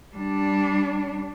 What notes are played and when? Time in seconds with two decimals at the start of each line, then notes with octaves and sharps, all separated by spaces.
0.16 G3 D4